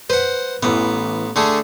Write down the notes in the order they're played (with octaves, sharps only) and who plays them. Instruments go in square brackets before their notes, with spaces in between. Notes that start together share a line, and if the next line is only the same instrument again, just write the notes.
[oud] B4 [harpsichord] C5 F#5
[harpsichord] A1 B3 [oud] E3
[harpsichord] D3 A3 G#4